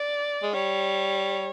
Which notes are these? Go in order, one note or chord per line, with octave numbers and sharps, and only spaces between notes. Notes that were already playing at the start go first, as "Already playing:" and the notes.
Already playing: D5
G#3
G3 C#5